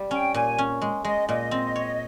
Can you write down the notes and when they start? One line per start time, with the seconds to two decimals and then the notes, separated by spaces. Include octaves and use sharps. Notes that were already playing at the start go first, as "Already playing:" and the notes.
Already playing: G3
0.11 C#4 G5
0.34 A#2 G#5
0.58 C#4
0.82 G#3
1.05 G#3 D#5
1.28 A#2 D#5
1.51 C4
1.76 C#5